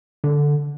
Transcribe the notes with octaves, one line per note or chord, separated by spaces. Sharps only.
D3